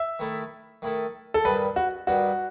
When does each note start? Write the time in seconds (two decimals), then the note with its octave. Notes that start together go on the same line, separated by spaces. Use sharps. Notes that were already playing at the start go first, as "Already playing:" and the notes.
Already playing: E5
0.19 D#3 A3 E4 A4
0.82 D#3 A3 E4 A4
1.34 A4
1.44 G2 D#3 G3 B4
1.76 F#4
2.07 G2 D#3 G3 F#4